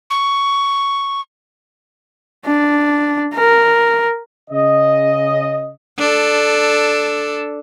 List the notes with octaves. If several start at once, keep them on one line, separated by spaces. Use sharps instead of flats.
C#6
D4
A#4
C#3 D#5
D4 A4